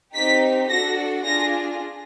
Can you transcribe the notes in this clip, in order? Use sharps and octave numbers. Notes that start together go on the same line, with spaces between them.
C4 D#4 G4 B6
D4 F#4 A4 A#6
D4 F4 G#4 A#6